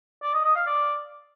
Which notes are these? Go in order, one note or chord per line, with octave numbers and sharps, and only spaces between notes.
D5
D#5
D#5
F5
D5